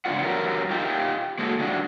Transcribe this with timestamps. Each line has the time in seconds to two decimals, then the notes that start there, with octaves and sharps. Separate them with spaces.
0.05 G#2 C#3 A#3 D4 F4 F#5
0.20 E2 F#3 G3 A#4
0.70 D#4 F4 G4
1.39 G#3 A#3 F#4 G#4 A4
1.59 D#3 G3 D4 F#4